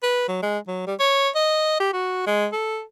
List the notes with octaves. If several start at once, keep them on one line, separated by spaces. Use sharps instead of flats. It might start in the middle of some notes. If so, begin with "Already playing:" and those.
B4
F#3
G#3
F#3
G3
C#5
D#5
G4
F#4
G#3
A4